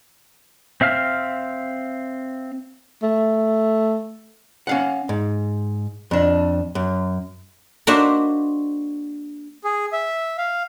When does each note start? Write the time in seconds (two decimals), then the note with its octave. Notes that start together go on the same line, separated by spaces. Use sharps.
0.81 C4 E5 F5 F6
3.03 A3
4.67 C#4 F5 F#5
5.09 G#2
6.11 F2 D4
6.75 F#2
7.87 A#3 D4 F#4 C5 D#5 E5
9.64 G#4
9.93 E5
10.38 F5